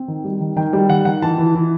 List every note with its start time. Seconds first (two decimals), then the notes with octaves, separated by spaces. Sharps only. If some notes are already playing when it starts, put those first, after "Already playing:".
Already playing: C4
0.08 D#3
0.24 G3
0.41 D#3
0.56 D#3 G5
0.73 G3 G5
0.89 D#3 F#5
1.05 D#3 F#5
1.22 E3 A5
1.38 E3
1.55 E3